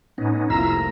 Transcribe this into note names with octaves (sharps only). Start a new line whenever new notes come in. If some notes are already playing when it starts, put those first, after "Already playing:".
A2 B3 C#4 D#4
F1 C2 A3 A#3 E4 F4 A#5 E6